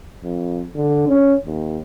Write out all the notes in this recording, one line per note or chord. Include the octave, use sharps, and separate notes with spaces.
F2
D3
C#4
D#2